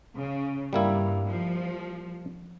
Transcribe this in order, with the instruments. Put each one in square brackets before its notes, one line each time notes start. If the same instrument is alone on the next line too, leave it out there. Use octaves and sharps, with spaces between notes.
[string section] C#3
[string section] G2 [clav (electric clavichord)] G3 A#3 E4
[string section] F3